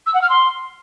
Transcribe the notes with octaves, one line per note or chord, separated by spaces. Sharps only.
E6
F#5
F6
C6